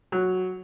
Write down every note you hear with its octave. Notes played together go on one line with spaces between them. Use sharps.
F#3